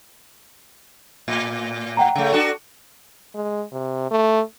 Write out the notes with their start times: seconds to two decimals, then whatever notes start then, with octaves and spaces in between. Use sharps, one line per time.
1.28 A2
1.97 F#5 G5 A#5
2.15 C#3 A3
2.33 D4 F#4 A4
3.35 G#3
3.72 C3
4.11 A3